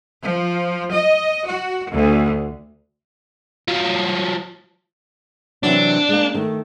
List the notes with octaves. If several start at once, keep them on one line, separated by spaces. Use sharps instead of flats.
F3
D#5
F#4
D2
F3 F#3
C3 E3 F#3 D4
G#3 A#3
D#3 A3